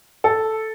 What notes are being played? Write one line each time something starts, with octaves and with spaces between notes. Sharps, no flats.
A4